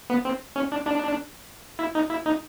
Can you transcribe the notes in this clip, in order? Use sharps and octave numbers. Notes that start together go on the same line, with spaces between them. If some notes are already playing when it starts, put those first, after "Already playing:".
B3
C4
C#4
D4
D4
E4
D#4
E4
D#4